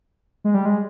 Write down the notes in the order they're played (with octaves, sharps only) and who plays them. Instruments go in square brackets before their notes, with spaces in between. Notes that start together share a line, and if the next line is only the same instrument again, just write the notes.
[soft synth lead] G#3
G3
G#3